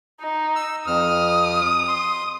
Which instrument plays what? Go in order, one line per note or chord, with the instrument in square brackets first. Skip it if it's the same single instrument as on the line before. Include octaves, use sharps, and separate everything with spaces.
[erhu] D#4
[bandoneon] E6
[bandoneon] F2 F6 [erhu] D#6
[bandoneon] C6